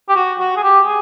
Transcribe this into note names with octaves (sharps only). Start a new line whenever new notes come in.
G4
F#4
F#4
G#4
G4
G#4